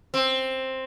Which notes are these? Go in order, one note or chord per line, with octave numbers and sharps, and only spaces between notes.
C4